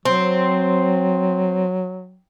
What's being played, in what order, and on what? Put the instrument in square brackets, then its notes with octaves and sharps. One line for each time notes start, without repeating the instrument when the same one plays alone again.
[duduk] F#3 [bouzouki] C4